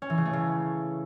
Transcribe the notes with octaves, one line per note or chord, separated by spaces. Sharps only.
C#4
E3
C#3
A3
C#3